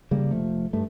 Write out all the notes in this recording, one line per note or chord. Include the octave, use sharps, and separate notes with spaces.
C#3 G3 A#3
F1 F3 A3
G2 A3